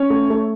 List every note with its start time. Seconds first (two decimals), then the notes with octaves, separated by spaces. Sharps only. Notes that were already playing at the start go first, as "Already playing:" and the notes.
Already playing: C#4 C#5
0.10 A3
0.30 A3